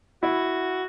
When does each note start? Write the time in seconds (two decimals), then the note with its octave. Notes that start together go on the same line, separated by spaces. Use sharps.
0.23 E4 F#4